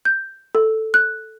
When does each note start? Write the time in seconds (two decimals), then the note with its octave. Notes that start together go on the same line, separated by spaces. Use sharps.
0.05 G6
0.55 A4
0.94 F#6